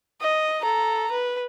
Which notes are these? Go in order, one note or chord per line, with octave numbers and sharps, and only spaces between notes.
D#5
A4 A#5
B4